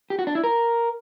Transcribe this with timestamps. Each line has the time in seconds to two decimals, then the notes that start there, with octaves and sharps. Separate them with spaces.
0.10 G4
0.19 F#4
0.27 D4
0.35 E4
0.44 A#4